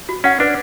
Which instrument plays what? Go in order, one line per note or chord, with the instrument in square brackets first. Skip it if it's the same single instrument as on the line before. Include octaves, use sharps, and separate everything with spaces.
[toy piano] F#4
[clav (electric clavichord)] C#4 [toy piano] F#5
[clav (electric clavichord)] D4 [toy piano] B4